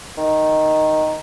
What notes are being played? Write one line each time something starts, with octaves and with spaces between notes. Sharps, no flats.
D#3